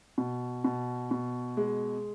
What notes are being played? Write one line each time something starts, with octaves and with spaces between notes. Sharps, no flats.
B2
B2
B2
G#3